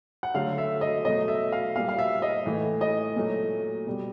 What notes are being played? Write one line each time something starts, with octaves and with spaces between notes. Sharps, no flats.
F#5
D3 F#3 A3 F5
E5
D#5
B2 F#3 A3 D#5
E5
F5
A#2 G3 F5
F5
E5
D#5
A2 E3 A3
D#5
A#2 F#3 A3
B2 G3